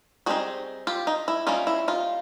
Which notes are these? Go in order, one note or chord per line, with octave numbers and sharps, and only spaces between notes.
G3 C4 D#4 F#4 G#4
F4 G4
D#4
E4
G3 A#3 C#4 D#4 F4
E4
D#4 F4